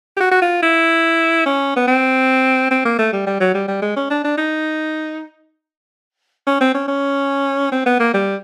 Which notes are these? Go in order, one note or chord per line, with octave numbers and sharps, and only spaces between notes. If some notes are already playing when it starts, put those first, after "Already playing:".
G4
F#4
F#4
F4
E4
C#4
B3
C4
C4
A#3
A3
G3
G3
F#3
G3
G3
G#3
C#4
D4
D4
D#4
C#4
C4
C#4
C#4
C4
B3
A#3
G3